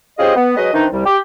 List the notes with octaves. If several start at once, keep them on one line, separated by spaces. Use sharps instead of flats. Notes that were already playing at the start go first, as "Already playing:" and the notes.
C#4 F4 G4 G#4 C5 D#5
B3
F#3 G#3 F#4 B4 D#5
D#3 E3 C4 D4 D#4
C2 G3
G4